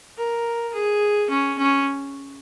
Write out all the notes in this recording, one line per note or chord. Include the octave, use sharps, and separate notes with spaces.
A#4
G#4
C#4
C#4